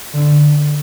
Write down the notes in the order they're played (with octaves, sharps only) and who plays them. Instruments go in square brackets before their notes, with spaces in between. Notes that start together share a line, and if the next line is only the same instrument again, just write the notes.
[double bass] D3